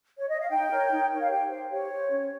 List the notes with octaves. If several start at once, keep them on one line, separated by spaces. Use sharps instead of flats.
C#5
D#5
F5
D#4 G5
A#4 C#5
D#4
A#4 C#5
F5
G4 G5
C5 F5
G4 C#5
C5
C#4